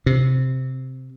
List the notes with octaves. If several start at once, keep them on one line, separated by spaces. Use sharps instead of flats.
C3